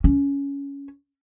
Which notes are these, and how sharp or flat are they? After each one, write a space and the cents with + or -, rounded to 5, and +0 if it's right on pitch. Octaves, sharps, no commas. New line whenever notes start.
C#4 +15